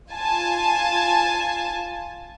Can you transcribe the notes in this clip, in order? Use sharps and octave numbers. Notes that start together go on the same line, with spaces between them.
F4 G#5 A5